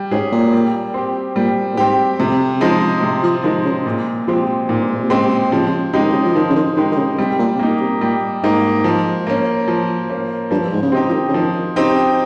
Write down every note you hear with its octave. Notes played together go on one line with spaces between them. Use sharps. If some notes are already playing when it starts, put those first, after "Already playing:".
Already playing: G3
G#2 C#4 G#4
A#2
G3
C4 G4
A#2 G3
A#2
G#2 C4 G4
F2 C3
C3
C#3 F3 G#3 D#4
C3
F3
D#3 F3 G#3 D#4
C#3
A#2
F3 G#3 C4 G4
A#2 D#3
G2
G#2
A#2
C3
C#3 G#3 C4 G4
C#3 F3
C3
C#3
C#3 G#3 D#4 G4
D#3
C#3
F3
D#3 F3
C#3
D#3
D#3 G#3 D#4 G4
D#3
C#3
C3 G3
A#2
C3
A#2 A#3 D#4
C3
A#2 G3
G#2 A#3 D#4
F3
A#3 C#4
F3
A#3 C#4
G2 F3
G#2
C#3
C3 C4 D#4 G4
F3
D#3
C#3
D#3 F3
C#3 C4 D#4 G4